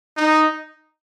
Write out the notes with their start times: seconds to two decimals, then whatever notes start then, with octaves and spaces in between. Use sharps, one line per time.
0.17 D#4